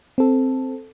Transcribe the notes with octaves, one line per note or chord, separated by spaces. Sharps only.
C4 A4